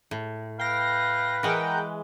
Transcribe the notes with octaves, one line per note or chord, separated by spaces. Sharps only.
A2
B4 F5 G5 A#6
E3 G#3 A#4 F#5 G5